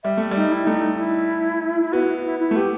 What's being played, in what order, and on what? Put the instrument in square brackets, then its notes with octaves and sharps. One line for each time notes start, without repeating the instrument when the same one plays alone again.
[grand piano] G3 [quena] E5
[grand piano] A3
[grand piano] G3 [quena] D#4
[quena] E4
[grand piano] A3 [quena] D#4
[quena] D#4
E4
E4
[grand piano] B3 [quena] F#4
[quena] E4
E4
[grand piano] A3
[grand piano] B3 [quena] G4